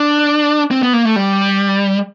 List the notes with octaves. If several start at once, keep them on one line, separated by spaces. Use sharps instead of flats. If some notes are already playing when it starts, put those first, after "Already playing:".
Already playing: D4
C4
B3
A#3
A3
G3